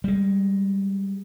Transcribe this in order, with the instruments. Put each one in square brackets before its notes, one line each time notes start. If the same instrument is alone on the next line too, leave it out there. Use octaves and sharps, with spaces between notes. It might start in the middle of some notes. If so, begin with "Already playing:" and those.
[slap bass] G3 G#3